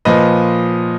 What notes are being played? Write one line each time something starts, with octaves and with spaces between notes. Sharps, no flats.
A#2 F3 B4 D#5